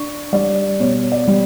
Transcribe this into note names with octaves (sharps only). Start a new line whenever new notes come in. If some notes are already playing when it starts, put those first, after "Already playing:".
Already playing: D4 C#6
G3 D5
B2 C#5
D5
G3